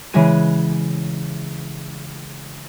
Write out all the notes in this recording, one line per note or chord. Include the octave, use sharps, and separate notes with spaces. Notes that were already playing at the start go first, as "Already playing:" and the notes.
C#3 E3 G#3 G#4 G#6 D#7